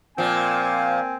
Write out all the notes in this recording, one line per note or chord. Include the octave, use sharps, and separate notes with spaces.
A#2 F3 A#3 C4 G#5